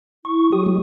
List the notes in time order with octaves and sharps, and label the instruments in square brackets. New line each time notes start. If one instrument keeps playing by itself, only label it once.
[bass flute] E4 [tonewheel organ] C#6
[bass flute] F#3 [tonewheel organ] G4 D#6
[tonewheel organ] G#3